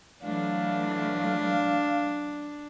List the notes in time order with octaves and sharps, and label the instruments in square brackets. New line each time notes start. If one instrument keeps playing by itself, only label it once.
[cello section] E3 F#3 A3 [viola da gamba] D4 [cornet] F5